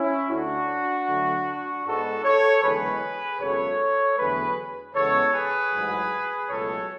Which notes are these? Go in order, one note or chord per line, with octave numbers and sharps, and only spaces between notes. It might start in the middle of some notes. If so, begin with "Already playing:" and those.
Already playing: C#4 E4
D2 D3 A3 D4 F#4
D2 D3 F#3 A3
G#2 G#3 B3 F#4 A4
A4 C#5
F#1 E2 D3 G#3 B3 G#4 B4
G#1 F#2 C#3 F#3 B3 A4 C#5
E2 D3 F#3 A3 G#4 B4
E2 C#3 G#3 B3 A4 C#5
G#4 B4
A1 G#2 F#3
C#2 B2 F#3 A3 A4 C#5